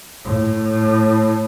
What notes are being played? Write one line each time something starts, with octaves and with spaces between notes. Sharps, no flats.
A2